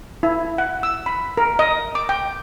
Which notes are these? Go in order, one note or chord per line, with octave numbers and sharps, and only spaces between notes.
E4
F#5
E6
B5
A#4
D#5
D6
G5